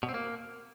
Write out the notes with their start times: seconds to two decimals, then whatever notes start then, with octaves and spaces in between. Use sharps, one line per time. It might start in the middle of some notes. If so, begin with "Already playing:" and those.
0.03 B2
0.09 C4
0.14 A#3